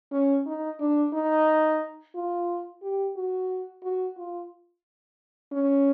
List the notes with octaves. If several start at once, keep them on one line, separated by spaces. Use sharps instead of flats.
C#4
D#4
D4
D#4
F4
G4
F#4
F#4
F4
C#4